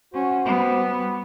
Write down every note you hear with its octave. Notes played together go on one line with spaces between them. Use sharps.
C#4 F#4 C5
G3 B3